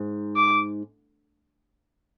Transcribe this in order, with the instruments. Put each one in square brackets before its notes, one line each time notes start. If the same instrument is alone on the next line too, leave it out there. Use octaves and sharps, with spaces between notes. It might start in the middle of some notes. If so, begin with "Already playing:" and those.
Already playing: [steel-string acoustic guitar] G#2
[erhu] D6